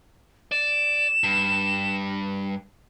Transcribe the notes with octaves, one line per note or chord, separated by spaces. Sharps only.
D5 E7
G2